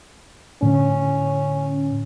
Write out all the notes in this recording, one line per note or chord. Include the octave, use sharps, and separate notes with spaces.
A2 D3 C#4